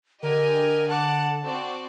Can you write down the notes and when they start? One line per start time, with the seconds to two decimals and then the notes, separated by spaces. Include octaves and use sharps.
0.23 D3 G4 A#4 D#5 G#5
0.89 F#5 A5 D6 F#6
1.43 C4 F#4 D5